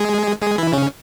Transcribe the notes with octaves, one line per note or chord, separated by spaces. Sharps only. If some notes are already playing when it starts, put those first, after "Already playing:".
Already playing: G#3 G#4
G#3 G#4
E3 E4
C#3 C#4